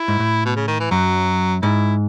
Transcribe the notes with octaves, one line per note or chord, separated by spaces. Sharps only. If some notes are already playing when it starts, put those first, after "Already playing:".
Already playing: E4
G#2
A2
B2
C#3
D#3
E3
F#2 F#3
G#2 E4